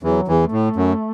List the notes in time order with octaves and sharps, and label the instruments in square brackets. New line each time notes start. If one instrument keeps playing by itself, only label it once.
[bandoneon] E2 E3 [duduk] F#3
[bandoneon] E2 E3
[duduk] A3
[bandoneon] A2
F#2